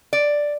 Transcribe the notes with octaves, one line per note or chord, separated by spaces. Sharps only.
D5